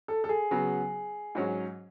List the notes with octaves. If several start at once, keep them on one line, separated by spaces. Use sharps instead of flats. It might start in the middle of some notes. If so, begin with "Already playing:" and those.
A4
A4
G#4
C#3 F#3 B3
G#2 F#3 C#4